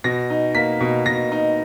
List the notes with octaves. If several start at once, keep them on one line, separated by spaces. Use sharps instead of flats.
B2 A#6
D#4
A#3 B6
B2
B2 A#6
D#4